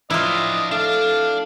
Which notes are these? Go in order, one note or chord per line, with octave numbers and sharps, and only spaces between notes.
F3 D4 E4 F4 D#5 F5
A3 D4 F5